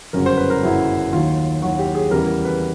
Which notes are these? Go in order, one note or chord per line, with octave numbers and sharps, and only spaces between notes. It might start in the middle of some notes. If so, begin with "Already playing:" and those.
G1 F#2 C#3 F#3 A#4
C5
B4
A#4
G1 F#2 C#3 F#3 E4
D#2 D#3 F#3 F4
D#2 D#3 F#3 F#4
G4
G#4
E2 C#3 E3 G3 A#4
A#4
B4